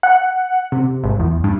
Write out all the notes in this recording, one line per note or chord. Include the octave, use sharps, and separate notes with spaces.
F#5
C3
G#1
E2
G2